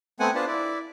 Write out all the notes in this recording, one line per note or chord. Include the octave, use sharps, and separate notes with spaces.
A3 B3 C4 F#5 G#5
B3 D4 F4 B4 C5 A5
E4 D5